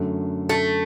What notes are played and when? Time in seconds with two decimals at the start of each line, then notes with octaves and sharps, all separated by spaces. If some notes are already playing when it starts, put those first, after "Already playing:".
Already playing: F#2 D3 F#3 A3
0.50 A3